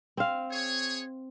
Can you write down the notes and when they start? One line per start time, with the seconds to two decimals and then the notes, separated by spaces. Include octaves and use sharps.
0.17 C4 F5
0.51 G#4 C#5